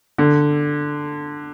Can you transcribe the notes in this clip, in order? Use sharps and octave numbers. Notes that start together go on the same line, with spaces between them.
D3